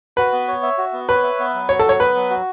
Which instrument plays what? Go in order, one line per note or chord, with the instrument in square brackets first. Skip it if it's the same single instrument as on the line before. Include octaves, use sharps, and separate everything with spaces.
[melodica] F#4 [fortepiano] B4
[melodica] B3
C#5
E5
F#4
B3
[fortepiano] B4 [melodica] C#5
[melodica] E5
B3
F#3
[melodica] F#4 [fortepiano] C#5
[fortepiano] A4
[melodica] F#3 [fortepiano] C#5
[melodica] B3 [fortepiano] B4
[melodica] F#3
F#4